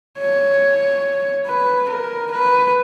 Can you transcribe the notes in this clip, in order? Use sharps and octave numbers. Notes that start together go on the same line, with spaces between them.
C#5
B4
A#4
B4